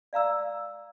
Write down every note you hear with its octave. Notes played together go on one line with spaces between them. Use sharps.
D5 F5 A#5 E6